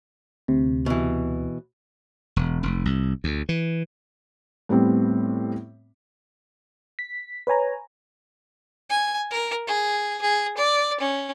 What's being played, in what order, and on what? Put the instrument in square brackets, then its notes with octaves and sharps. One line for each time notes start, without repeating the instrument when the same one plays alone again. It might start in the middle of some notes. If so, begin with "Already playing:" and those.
[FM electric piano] D2 C3
[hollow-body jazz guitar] B2 E3
[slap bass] E1
F1
C2
D2
E3
[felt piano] A2 G3 B3 C4
[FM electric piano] B6
B4 C#5 G#5 A#5
[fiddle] G#5
A#4
G#4
G#4
D5
C#4